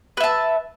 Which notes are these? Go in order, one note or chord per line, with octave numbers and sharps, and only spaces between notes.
B4 E5 A5